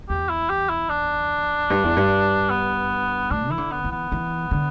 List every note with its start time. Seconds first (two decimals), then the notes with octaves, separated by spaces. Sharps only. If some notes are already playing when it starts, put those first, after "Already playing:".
0.09 E2 G4
0.29 E4
0.49 G4
0.70 E4
0.89 D4
1.70 G2
1.84 E2
1.97 G2
2.50 B3
3.31 A2 D4
3.50 E3 E4
3.58 D3
3.72 B3
3.84 E3
3.91 B3
4.12 E3
4.51 D3